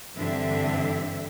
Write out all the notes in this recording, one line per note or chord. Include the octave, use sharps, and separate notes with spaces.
G2 D3 E3 C4 D4 E5